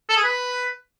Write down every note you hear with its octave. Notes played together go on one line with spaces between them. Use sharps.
A4
G#4
B4